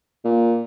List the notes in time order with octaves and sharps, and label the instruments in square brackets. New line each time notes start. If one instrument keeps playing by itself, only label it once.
[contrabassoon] A#2